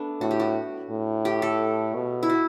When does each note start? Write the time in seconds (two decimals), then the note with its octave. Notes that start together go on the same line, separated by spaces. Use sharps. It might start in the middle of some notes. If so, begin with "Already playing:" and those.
Already playing: A3 B3 D4
0.21 A2 F#4
0.31 G4
0.40 F#4
0.90 A2
1.25 G4
1.42 A4
1.95 B2
2.23 E4
2.30 F#4